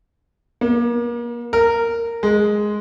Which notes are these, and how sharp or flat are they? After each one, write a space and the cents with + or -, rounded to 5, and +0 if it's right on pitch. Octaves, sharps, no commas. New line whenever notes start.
A#3 +35
A#4 -10
G#3 +5